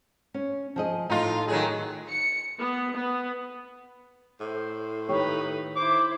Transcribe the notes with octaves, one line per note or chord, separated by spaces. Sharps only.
C#4
F3 G#4 D#5
A2 D#4 F4
D#3 F#3 G#4
C#7
B3
B3
A2 C5
D#3 D#4 G4 B4 C#5
E4 C5 D6